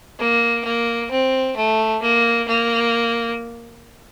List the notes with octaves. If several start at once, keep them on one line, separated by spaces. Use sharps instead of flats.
A#3
A#3
C4
A3
A#3
A#3